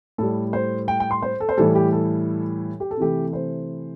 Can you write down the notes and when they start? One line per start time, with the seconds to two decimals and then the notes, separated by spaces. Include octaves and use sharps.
0.18 A2 G3 A4
0.53 C5
0.88 G5
1.00 G5
1.11 C6
1.22 C5
1.40 A4
1.49 C5
1.57 A2 E3 G3 A4
1.75 G4
1.92 A4
2.80 G4
2.91 A4
2.97 C3 E3 A3 G4
3.33 C5